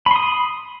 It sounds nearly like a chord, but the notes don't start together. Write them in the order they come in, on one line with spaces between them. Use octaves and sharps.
B5 C6 D#6